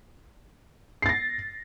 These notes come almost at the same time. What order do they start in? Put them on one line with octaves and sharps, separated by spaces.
C7 A6 A#6